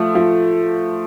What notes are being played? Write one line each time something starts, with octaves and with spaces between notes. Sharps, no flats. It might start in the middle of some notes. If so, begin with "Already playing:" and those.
Already playing: F3 A3
F3